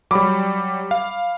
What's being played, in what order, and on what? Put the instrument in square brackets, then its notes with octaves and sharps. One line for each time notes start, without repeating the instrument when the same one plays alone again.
[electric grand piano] F#3 G3 [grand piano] B5 D6
[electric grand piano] F5